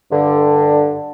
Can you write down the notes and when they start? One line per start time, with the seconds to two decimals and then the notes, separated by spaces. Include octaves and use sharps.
0.12 G2 D3